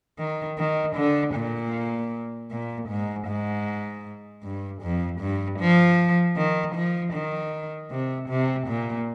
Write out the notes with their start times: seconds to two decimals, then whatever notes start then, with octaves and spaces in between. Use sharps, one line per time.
0.19 D#3
0.58 D#3
0.96 D3
1.35 A#2
2.51 A#2
2.89 G#2
3.27 G#2
4.43 G2
4.82 F2
5.21 G2
5.59 F3
6.37 D#3
6.75 F3
7.13 D#3
7.91 C3
8.29 C3
8.68 A#2